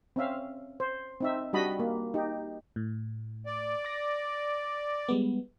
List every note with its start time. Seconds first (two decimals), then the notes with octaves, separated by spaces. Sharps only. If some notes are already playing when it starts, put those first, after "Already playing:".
0.16 C4 C#4 E5 F5
0.80 C5
1.21 C4 D#4 E5
1.53 G3 D4 F#4 D#5 A5 B5
1.79 A#3
2.14 D#4 G4
2.76 A2
3.46 D5
3.85 D6 A#6
5.09 G3 G#3 B3